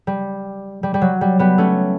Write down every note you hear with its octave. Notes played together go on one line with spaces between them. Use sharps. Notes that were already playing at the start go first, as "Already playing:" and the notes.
G3
G3
G3
F#3
G3
G3 B3
A3 C#4